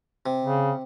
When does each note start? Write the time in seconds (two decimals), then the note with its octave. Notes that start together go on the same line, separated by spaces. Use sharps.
0.26 C3
0.44 C#3